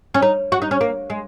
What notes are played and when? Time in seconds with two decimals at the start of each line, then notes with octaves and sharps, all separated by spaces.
0.14 C#4
0.22 D#4
0.52 F#4
0.62 D#4
0.71 C#4
0.81 A#3
1.10 G#3